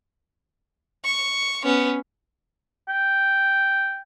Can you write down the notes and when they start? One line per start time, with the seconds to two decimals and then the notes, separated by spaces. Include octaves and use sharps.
1.04 C#6
1.65 B3 C#4
2.89 G5